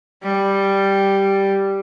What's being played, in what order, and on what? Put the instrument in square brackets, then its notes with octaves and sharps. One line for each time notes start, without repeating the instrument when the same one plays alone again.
[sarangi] G3